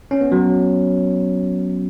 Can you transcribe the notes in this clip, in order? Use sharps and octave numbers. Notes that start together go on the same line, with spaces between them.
C#4
B3
F#3